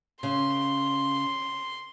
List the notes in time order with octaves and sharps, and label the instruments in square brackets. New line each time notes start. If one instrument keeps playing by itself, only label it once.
[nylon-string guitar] C#3 [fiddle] C6